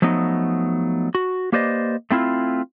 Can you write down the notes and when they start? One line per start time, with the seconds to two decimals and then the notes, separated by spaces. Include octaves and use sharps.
0.02 F3 F#3 A3 B3 D#4
1.15 F#4
1.52 A#3 G4 B4 C5 D5 D#5
2.11 A3 C4 E4 F4